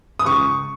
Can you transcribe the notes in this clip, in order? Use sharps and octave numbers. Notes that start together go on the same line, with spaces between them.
D#6
C#2 C#6